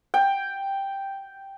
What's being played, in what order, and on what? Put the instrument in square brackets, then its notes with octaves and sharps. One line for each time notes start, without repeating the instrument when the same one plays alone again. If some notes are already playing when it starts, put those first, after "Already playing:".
[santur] G5